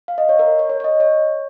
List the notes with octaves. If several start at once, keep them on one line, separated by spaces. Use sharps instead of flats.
F5
D#5
C#5
A#4
C#5
C#5
C#5
D#5
C#5